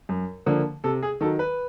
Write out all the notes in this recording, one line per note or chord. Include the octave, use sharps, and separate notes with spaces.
F#2
D3 F3 A#3
C3 A4
G#4
D#3 F#3 A4
B4